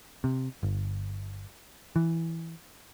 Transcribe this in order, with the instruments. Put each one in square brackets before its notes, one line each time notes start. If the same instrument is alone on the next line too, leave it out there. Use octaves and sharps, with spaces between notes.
[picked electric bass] C3
G1
E3